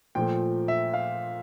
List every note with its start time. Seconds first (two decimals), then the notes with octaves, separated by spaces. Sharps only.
0.15 A#2 F3 A3 G5
0.68 E5
0.94 F5